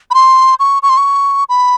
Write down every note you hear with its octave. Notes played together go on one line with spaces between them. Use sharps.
B5
C6
C#6
C#6
C6
C#6
B5